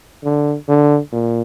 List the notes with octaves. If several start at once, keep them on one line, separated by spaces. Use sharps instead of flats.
D3
D3
A#2